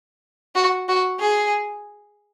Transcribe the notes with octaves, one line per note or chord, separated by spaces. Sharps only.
F#4
F#4
G#4